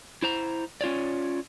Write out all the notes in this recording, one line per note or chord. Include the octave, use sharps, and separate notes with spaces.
E4 C5 A#5
C#4 F4 C#5 D5